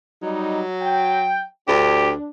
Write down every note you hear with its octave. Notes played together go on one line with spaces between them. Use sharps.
F#3 G3 D#4
G5
D2 D4 G4